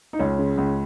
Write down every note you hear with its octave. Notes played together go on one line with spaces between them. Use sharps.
D#4
C#2 C#4
C#3
C#2